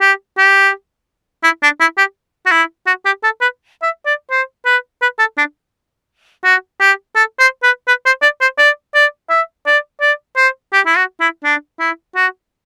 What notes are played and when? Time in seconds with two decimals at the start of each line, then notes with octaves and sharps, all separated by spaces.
0.01 G4
0.38 G4
1.44 E4
1.63 D4
1.80 E4
1.98 G4
2.46 F#4
2.51 E4
2.87 F#4
3.06 G4
3.24 A4
3.41 B4
3.82 E5
4.06 D5
4.31 C5
4.66 B4
5.02 B4
5.19 A4
5.38 D4
6.44 F#4
6.81 G4
7.16 A4
7.40 C5
7.63 B4
7.88 B4
8.06 C5
8.22 D5
8.41 C5
8.58 D5
8.95 D5
9.30 E5
9.67 D5
10.01 D5
10.37 C5
10.73 G4
10.86 E4
10.96 F#4
11.20 E4
11.44 D4
11.80 E4
12.16 F#4